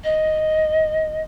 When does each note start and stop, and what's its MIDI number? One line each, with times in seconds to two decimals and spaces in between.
0.04 1.21 75